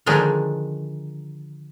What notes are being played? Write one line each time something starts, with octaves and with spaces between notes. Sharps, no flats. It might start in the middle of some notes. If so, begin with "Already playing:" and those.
D3 D#3 F3 G#3 D4